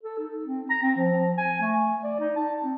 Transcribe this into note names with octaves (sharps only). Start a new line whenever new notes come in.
A4
D#4
C4
A#5
C4
F3
G#5
A3
D5
D#4
A5
C4